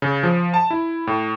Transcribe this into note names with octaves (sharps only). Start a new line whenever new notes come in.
C#3
F3
A5
E4
A2